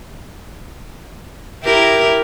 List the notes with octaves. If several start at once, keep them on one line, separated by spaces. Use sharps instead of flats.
E4 G4 A#4